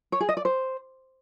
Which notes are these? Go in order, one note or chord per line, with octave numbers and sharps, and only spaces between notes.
C#5
G#4
D#5
D5
C5